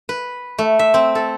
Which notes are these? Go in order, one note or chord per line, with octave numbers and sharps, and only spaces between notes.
B4
A3
E5
C4
A4